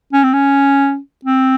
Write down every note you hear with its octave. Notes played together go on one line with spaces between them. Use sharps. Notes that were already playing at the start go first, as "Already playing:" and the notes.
C#4
C4
C#4
C4